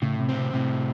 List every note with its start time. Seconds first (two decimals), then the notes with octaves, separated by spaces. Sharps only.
0.02 A2 C#3
0.19 C3
0.29 C4
0.37 C3
0.53 A2 C3